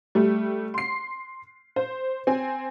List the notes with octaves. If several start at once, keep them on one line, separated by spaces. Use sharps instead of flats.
G3 A3
C6 C7
C5
C4 G#5